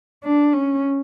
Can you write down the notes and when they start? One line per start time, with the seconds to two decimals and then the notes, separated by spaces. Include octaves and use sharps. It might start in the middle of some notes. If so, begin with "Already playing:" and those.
0.24 D4
0.53 C#4